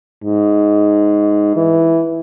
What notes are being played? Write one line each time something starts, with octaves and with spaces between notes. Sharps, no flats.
G#2
E3